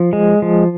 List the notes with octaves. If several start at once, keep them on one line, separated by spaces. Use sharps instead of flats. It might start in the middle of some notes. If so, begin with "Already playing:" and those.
Already playing: F3
G#3
F3